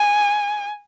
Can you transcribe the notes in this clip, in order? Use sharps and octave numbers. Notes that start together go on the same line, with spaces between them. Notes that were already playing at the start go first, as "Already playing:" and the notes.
Already playing: G#5